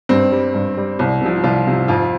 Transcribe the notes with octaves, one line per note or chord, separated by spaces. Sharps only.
G2 C4
G3
G2
G3
C2
C3 F3
C2 F4
C3 F3
F2 F4